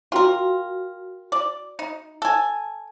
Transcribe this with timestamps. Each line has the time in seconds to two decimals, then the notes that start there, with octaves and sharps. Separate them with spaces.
0.12 F4 F#4 A#4 G5 C6
1.32 D5
1.79 D#4
2.22 A4 G#5